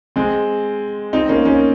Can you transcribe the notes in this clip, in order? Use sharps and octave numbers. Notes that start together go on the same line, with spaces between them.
G#3 C4
C4 D#4
A#3 C#4
A#3 C#4